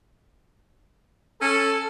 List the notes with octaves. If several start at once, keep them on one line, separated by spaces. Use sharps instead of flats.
C#4 A4